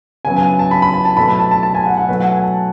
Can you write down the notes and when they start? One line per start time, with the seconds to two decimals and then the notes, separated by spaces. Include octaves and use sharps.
0.25 C#3 F#3 B3 G#5
0.36 G#5
0.59 A5
0.71 B5
0.82 B5
0.94 A5
1.05 A5
1.17 B2 F#3 A3 B5
1.28 A5
1.40 A5
1.51 A5
1.63 A5
1.75 G#5
1.86 F#5
1.97 F#5
2.08 B2 F#3 A3 B4
2.20 F#5
2.32 G#5
2.43 A5